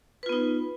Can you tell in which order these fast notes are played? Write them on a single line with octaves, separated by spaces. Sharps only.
B4 F4 B3 D#4